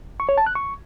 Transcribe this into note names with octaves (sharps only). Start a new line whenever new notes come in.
C#6
C#5
A5
F#6
C#6